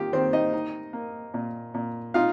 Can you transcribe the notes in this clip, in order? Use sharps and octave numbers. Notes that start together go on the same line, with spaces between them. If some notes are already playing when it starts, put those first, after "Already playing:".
Already playing: D#3 F4 G4
D#3 C4 C5
D#4 D#5
D#4
A#3
A#2
A#2
D#4 F4 F5